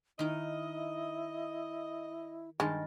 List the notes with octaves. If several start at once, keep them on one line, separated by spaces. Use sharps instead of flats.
D#3 D#4 E4 D#5
G2 D#3 G#3 D#5 A5